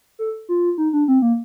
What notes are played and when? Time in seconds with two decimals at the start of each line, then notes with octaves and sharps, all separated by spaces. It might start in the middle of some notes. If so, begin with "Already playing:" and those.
0.19 A4
0.49 F4
0.78 D#4
0.93 D4
1.08 C4
1.22 A#3